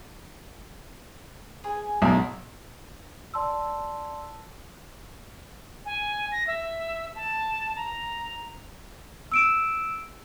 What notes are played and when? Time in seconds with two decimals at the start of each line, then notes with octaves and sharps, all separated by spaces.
1.64 G#4 B4 G#5
2.02 B1 D4
3.34 D5 A5 C6 E6
5.85 G#5
6.32 A#6
6.47 E5
7.15 A5
7.76 A#5
9.32 E6 D7 E7